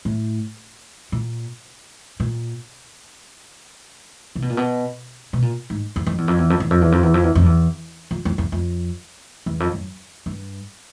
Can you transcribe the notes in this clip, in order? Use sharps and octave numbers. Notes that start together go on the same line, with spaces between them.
A2
A#2
A#2
C3
B2
A#2
B2
B2
A#2
G#2
E2
F2
E2
F2
E2
F2
E2
F2
E2
F2
E2
F2
E2
F2
E2
F2
F2
E2
F2
E2
F2
F#2
G2